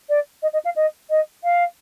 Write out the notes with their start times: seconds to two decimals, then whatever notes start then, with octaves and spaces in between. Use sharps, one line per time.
0.09 D5
0.42 D#5
0.53 D#5
0.65 F5
0.76 D#5
1.10 D#5
1.44 F5